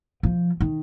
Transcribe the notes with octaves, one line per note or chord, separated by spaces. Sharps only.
F3
D#3